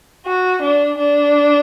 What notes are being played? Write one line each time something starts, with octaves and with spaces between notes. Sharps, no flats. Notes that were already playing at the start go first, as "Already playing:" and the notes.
F#4
D4
D4